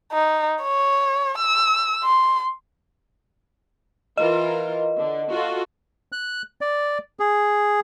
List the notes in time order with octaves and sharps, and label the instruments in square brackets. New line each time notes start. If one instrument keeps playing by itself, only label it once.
[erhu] D#4
C#5
E6
C6
[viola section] E3 F4 A#4 [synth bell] D#5
[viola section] D3
F4 F#4 A4
[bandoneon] F#6
D5
G#4